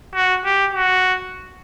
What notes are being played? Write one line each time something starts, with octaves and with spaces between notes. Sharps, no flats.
F#4
G4
F#4